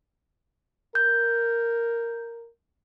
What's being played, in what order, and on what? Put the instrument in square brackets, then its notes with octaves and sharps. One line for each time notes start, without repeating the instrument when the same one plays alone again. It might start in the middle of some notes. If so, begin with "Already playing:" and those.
[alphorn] A#4 [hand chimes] G6